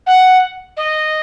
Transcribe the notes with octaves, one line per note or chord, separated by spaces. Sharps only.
F#5
D#5